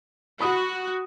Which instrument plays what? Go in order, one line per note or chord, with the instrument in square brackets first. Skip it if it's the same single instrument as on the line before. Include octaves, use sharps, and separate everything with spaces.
[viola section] F#4 [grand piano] B5 D#6